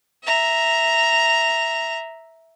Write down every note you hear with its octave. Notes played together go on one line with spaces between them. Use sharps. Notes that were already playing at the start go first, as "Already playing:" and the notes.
E5 A#5